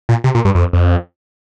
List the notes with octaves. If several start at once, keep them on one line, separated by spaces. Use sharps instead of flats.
A#2
C3
A#2
G2
F2
F2